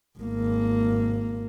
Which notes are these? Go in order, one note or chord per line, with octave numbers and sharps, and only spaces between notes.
G#1 A#3